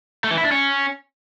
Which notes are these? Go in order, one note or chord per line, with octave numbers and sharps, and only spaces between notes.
A3
E3
E4
D4
C#4